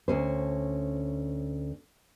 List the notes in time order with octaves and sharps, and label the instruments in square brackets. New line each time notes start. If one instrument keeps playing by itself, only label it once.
[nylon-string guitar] D2 A#2 C#4 C5